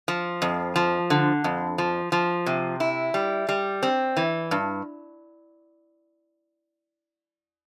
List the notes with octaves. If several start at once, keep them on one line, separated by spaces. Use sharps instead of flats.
F3
F2
F3
D3
F2
F3
F3
C3
E4
G3
G3
C4
E3
G2